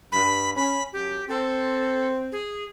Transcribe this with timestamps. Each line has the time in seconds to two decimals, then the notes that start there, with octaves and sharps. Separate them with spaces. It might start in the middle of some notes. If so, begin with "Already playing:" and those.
0.12 G2 B5
0.56 C#4 B5
0.93 F#2 G4
1.29 C4 A4
2.32 G#4